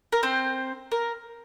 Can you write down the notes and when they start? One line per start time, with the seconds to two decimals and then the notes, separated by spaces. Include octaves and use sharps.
0.12 A#4
0.23 C4 C5
0.92 A#4